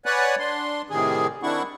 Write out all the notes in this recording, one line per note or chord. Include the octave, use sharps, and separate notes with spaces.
B4 C#5 D5 F#5 G#5 F#6
D4 C6
A2 C3 D#3 G#4
D#3 C4 D4 E4 F#5 C#6